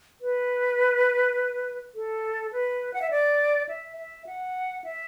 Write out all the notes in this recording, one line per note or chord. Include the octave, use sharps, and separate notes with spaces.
B4
A4
B4
F#5
E5
D5
E5
E5
F#5
E5